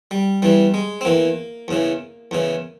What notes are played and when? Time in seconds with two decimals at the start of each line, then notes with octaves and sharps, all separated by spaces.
0.11 G3
0.42 E2 E3 G3
0.74 G#3
1.01 C4
1.05 E2 E3 A#3
1.68 E2 C#3 E3
2.31 E2 C#3 E3